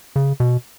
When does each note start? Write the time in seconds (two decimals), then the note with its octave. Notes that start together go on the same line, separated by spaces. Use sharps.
0.16 C#3
0.40 B2